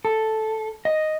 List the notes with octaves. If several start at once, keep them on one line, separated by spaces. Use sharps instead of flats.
A4
D#5